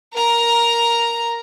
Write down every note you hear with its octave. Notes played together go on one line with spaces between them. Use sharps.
A#4 A#5